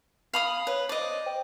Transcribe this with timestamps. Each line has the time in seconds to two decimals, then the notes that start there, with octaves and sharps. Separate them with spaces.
0.34 F5 B5 D#6
0.67 B4 C#5
0.89 C5 D5 D#5
1.26 G5